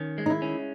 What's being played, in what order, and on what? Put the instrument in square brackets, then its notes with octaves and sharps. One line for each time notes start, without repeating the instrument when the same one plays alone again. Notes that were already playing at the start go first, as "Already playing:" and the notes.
Already playing: [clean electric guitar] D#3 C#4
G#3
[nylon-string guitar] D#4
E4
[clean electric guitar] C#4